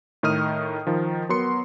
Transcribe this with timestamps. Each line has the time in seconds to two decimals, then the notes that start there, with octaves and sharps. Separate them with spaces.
0.23 A2 D#3 D#5 D#6 F6 D#7
0.87 D#3 F3
1.29 F#3 B3 A#4 C6 C#7